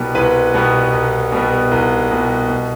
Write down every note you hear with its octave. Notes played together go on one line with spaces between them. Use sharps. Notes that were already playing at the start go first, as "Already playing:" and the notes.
Already playing: C2 B2 G3 B3
C2 B4 B5
B2 G3 B3
C2
B2 G3 B3
C2
B2 G3 B3
B2